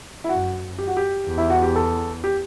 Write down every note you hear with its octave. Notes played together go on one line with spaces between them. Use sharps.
E4
F#2 F#4
G4
F#4
G4
E2
E4
F#4
G4
A4
G4